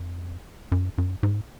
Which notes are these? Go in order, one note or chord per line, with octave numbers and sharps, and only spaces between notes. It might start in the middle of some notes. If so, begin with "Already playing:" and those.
Already playing: F2
F#2
F#2
G#2